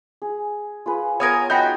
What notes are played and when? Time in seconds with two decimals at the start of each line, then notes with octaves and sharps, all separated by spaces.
0.22 G#4
0.86 F4 G#4 B4
1.20 B3 A#4 C#5 F5 G#5 D#6 G#6
1.50 D#4 F#4 G5 B5 G6